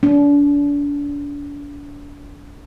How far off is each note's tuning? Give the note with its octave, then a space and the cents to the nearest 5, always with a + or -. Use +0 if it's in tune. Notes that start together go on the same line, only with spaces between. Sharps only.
D4 -35